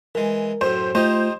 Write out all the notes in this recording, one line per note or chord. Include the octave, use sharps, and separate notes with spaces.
E3 G#3 A#4
F#2 A2 C5
A3 D#4 F4 G4 C5 D#5 G6